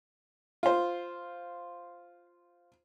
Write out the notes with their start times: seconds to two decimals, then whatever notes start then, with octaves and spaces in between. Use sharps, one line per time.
0.63 F4 C5